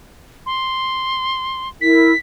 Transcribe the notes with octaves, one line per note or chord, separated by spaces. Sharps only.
C6
E4 A#4 B6